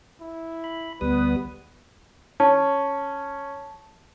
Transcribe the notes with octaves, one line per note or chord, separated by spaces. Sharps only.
E4
B5
D2 G3 B3 B4 D#6
C#4 A5